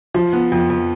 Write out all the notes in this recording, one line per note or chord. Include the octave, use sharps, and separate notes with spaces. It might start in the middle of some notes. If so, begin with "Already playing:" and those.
F3
B3
F2
F2